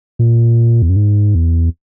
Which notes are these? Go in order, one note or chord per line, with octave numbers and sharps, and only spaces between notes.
A#2
E2
F#2
G#2
E2